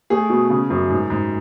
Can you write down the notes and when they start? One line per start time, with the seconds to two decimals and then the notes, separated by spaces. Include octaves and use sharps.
0.10 A3 G#4
0.29 B2
0.50 C#3
0.70 F#2
0.90 G#2
1.10 G#2